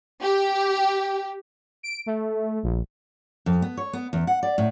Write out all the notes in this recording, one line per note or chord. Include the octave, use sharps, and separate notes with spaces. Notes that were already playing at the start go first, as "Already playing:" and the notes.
G4
D7
A3
A#1
F2
B3
C#5
B3
E2
F#5
D5
A2